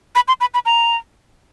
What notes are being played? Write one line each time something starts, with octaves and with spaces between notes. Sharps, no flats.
B5
C6
B5
B5
A#5